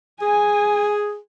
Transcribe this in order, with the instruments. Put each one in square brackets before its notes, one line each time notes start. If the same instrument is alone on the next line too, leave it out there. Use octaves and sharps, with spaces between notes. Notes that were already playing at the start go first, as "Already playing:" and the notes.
[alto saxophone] G#4 [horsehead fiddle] G#5